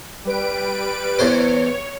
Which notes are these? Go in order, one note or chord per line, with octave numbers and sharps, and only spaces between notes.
G3 B4 D7
E2 C5 C#5